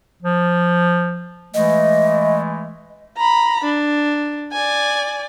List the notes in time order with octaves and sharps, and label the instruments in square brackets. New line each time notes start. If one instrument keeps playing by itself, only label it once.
[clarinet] F3
[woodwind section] E3 G#3 A3 [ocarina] D#5
[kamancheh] A#5 B5
D4
D5 G#5